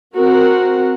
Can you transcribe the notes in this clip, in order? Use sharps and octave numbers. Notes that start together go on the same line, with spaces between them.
C4 F#4 A#4 F#5